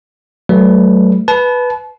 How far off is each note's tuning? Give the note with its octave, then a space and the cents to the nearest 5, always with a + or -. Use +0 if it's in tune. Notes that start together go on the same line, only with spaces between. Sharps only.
F#3 +35 A3 +0 B4 +0
B4 +0 A5 -35